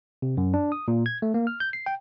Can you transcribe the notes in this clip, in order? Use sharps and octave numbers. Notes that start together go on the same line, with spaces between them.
C3
F#2
D4
D#6
A#2
G#6
A3
A#3
F6
G6
C7
G5